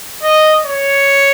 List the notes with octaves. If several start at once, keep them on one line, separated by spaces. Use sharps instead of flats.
D#5
C#5